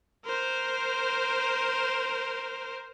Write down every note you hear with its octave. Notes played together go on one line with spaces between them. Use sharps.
A#4 C5